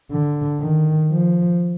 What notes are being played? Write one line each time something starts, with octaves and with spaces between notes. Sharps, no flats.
D3
D#3
F3